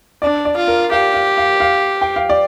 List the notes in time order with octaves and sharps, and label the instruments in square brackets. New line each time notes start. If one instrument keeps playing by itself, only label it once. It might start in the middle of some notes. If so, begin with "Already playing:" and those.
[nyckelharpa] D4 [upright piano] D5
[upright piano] D5
[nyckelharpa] F4
[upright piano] A#4
[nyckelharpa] G4 [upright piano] F5
[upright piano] F5
F5
F5
G5
F5
D5